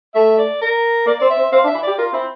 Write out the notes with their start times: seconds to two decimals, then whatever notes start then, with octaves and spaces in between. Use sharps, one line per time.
0.14 A3 E5
0.38 D5
0.61 A#4
1.06 A#3 D5
1.19 C4 D5
1.30 E5
1.37 C4
1.52 C4 F5
1.64 D4
1.67 E5
1.75 E4
1.83 G4 D5
1.98 F4 A#4
2.13 C4 E4